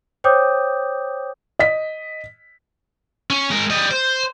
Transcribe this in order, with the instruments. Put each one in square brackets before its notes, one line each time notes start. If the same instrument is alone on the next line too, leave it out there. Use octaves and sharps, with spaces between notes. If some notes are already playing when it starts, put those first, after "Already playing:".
[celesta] C5 C#5 G5 D6 D#6 G6
[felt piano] D#5 B6
[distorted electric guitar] C#4
G#3 A#4
G3 D#5
C5